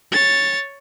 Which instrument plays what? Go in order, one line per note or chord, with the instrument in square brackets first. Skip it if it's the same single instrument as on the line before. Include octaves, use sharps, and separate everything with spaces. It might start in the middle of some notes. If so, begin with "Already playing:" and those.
[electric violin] C#5 A6